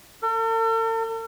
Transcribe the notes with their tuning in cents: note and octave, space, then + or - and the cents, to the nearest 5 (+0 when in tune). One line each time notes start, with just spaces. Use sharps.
A4 +45